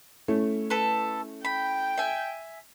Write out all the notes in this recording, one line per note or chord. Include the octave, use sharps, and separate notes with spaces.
A3 C#4 E4
A4 B4
G5 B5
E5 G#5